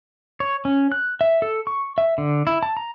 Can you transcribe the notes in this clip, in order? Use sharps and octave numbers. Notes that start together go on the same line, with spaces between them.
C#5
C#4
F#6
E5
A4
C#6
E5
D3
E4
A5
A#5